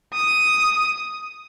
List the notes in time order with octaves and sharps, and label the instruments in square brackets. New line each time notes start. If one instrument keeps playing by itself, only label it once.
[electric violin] D#6